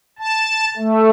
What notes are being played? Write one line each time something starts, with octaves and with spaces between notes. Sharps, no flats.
A5
A3